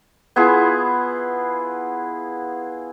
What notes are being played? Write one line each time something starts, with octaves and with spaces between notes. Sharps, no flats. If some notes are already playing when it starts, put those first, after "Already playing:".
B3 E4 F4 G#4